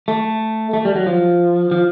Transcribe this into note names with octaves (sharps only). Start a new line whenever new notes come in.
A3
A3
G3
F#3
F3
F3